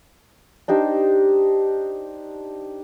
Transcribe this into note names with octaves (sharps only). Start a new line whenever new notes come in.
D4 D#4 G4 C5